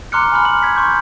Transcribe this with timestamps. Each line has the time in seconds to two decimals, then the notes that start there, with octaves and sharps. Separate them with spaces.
0.12 A#5 C6 D6 F6 F#6 C#7
0.32 G#5 B5 F6
0.45 F6 F#7
0.62 G#6 B6
0.76 C6 C#6 G6